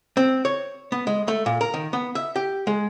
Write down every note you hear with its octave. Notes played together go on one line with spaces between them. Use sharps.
C4
C#5
B3
G#3
A3
A#2
A#4
D#3
B3
E5
G4
G#3